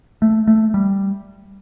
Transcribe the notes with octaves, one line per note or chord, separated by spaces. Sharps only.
A3
A3
G3